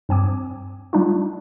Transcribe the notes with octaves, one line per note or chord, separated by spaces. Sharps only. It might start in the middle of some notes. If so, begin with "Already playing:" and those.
G2 C4 G#5 D6
G3 D4 D#4 F4